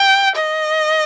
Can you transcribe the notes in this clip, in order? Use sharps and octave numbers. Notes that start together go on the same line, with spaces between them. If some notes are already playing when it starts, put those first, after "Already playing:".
Already playing: G5
D#5